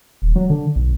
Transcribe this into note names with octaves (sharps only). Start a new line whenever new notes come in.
D#1
F#3
D3
B1